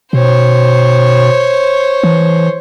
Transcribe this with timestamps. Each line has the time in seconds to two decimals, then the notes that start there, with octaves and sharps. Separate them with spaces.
0.13 B2 C5 C#5
2.03 E3